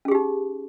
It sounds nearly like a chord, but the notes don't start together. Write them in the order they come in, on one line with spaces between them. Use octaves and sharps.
C#4 G#4 G4 D#4